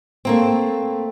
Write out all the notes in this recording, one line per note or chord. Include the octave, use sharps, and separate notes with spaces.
A3 A#3 C4